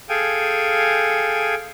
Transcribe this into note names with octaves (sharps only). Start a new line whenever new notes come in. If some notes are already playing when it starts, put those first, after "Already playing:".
G#4 A4 F5 G5 G#5